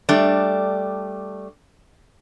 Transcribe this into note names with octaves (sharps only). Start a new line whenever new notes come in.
G3 A3 D4 D5